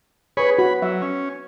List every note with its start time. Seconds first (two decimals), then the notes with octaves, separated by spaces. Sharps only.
0.37 G#4 B4 C#5 B5 C#6
0.59 F#4 B5
0.82 F#3 E5
1.02 C#4